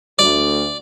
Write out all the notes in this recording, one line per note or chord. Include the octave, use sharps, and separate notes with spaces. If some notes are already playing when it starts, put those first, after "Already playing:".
D2 D5